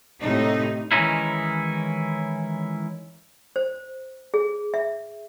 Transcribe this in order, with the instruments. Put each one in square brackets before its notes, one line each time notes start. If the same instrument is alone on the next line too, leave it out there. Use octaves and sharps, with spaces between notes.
[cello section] A2 C3 D#4
[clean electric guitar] D#3 E3 G#3 C#4 D#4 E4
[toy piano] C5
G#4
E5